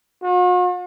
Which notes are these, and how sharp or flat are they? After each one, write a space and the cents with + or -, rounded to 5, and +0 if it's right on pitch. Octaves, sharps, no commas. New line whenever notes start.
F#4 -45